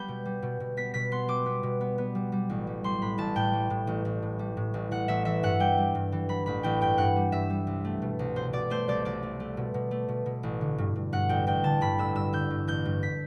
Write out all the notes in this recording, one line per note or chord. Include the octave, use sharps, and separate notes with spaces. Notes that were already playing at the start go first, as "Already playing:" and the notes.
Already playing: G3 B3 B5 G6
B2
G3
B2
B2
B3 B6
B2 B6
B3 C6
G3 D6
B3
B2
B3
B3
G3
G3
A1
G3
G3 C6
A2 B5
A1 A5
A2 G5
G3
A2
A1
A1
A2
G3
A2
A1
A1 F#5
A1 E5
E3 E5
G2 F#5
G3 G5
G3
G2
E3
E3 B5
A1 B5
A1 G5
G2 G5
G2 F#5
G3
G2 E5
G3
C2
A3
B2
C2
B2 C5
B2 D5
A3 C5
C2 D5
C2 D5
A3
A3
B2
B2
A3
B2
B2
A1
D3
G2
G2
G2 F#5
A1 G5
A1 G5
D3 A5
G2 B5
A1 E6
G2 E6
D3 G6
G2
A1 G6
G2
B6